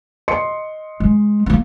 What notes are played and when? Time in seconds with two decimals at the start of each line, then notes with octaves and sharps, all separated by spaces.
0.28 D#5 C6 C#7
1.00 G#3
1.46 A#3 B3